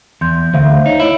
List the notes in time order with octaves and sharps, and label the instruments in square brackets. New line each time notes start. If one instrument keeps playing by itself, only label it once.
[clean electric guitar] E2 [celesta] C6 G6
[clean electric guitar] D2 [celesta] C5 E5 F5
[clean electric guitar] D#4 [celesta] C#5
[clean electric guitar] E4 [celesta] C#5 E6 D7